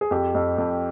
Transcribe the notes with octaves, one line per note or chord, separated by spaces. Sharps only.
G#4
F2 G4
F2
F2